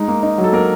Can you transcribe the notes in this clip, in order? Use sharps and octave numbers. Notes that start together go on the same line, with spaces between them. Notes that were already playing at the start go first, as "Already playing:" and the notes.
Already playing: G#3 D#4
A#3
D#4
F#3
A4
A#3 A#4